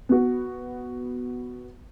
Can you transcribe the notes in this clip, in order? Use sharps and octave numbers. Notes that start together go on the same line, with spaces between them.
B3 F#4